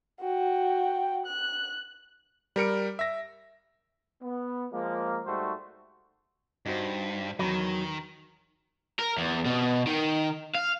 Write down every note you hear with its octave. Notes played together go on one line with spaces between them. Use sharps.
F#4 G5
F#6
G3 A#4 C#7 D7
E5 A#6
B3
F3 G#3 A#3
G#2 G3 A3 F#4 C5
G2 D#4 F#4 C5
E2 D#3 F#3 B5
A#4
E2
B2
D#3
F5